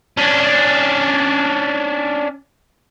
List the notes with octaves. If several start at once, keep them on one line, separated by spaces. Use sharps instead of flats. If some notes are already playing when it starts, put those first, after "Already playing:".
C#4 D4